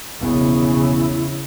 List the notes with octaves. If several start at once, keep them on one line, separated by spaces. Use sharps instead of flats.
E1 A#1 C#3 B3 E4